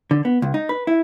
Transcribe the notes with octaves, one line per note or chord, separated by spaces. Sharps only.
D3
B3
C#2
D#4
B4
E4